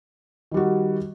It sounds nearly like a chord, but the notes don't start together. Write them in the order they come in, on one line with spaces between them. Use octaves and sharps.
D#3 G3 F#4